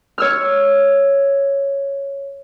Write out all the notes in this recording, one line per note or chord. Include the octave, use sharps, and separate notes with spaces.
C#5 E6 F6